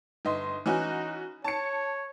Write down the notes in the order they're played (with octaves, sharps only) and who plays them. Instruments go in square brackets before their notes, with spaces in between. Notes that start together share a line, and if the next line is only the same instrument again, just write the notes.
[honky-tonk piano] G1 D#5 C6
[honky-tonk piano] E3 C#4 F#4 [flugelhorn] D#4
[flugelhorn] C#5 [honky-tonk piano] A5 C#7